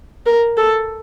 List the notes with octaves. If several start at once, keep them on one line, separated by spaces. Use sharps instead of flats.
A#4
A4